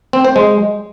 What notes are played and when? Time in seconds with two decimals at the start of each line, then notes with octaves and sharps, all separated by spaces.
0.13 C4
0.25 C5
0.36 G#3